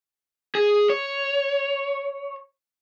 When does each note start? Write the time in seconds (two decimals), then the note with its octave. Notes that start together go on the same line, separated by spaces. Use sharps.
0.55 G#4
0.89 C#5